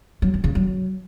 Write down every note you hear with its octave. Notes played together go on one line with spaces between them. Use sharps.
F#3
D#3
C#3
F#3